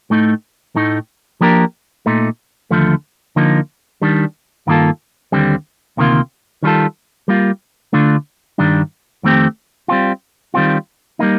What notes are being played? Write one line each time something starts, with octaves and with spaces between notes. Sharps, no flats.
A2 A3 D#4
A2 A3 D#4
F3 A#3 D4 G4 A#4
A#2 A3 D#4
D#2 D3 F3 A3
D3 F3 A#3 D#4
D#3 G3 D4
G2 D#3 A#3 F4 A4
D#2 D3 G3 C4
D2 C3 D#3 A#3 F4
D#3 G3 C4 F4 A4
G3 A#3 F4
D3 A3 D4 F4
G2 D#3 G3 D4
F2 D#3 A3 C4 G4
G3 C4 F4
D#3 G3 C4 F4
G3 A#3 D#4